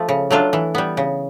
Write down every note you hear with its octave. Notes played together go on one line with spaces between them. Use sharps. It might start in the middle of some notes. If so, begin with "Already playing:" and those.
Already playing: F3 A3
C#3
F#3 A3 D4 F4
E3
G3 B3
C#3